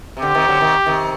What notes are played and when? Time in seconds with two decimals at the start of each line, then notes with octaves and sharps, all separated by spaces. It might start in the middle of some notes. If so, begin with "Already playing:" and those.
0.17 C3
0.22 D3 G4
0.35 C3 D#3
0.48 D3 F#3
0.60 C3 D#3
0.86 C3 D#3